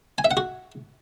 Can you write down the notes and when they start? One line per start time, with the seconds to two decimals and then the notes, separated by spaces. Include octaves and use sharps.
0.18 G#5
0.25 E5
0.31 F#5
0.37 F#4